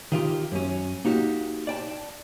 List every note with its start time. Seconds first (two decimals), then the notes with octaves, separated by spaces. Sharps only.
0.12 D#3 F4 G4
0.52 F#2 C#4
1.05 A#3 D#4 F#4 G4
1.67 D5 G5 A5